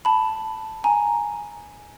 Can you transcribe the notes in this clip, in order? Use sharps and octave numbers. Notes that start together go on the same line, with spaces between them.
A5 B5
G#5 A#5